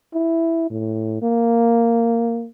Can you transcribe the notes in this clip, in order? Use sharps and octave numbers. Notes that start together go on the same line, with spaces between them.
E4
A2
A#3